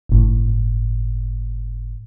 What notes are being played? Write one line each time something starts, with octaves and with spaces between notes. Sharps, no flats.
G1 A2